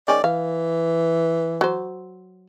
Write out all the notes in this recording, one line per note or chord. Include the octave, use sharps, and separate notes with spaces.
D#3 G#3 C#4 D5
E3 F5
F#3 C5